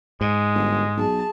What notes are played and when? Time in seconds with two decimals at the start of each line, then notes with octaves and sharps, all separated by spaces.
0.21 G#2 G#3
0.55 G1
0.97 B1 G#4 A5